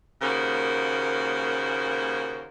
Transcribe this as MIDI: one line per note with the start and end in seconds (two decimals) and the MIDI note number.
0.22 2.48 39
0.22 2.48 49
0.22 2.48 58
0.22 2.48 66
0.22 2.48 70
0.22 2.48 72